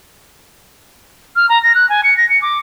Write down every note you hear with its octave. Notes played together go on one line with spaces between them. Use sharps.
F6
A#5
A#6
F#6
G#5
C#7
A#6
C#7
D6